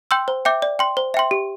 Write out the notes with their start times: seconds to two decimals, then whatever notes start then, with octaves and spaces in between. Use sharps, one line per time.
0.11 G5 C6 E6 G6
0.28 C5
0.45 E5 G5 D6 G6
0.62 D5
0.79 G5 C6
0.97 C5
1.14 E5 G5 C6
1.31 G4